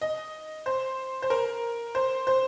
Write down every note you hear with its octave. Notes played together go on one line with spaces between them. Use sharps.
D#5
C5
C5
A#4
C5
C5